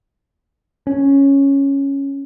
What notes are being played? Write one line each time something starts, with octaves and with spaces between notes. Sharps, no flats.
C#4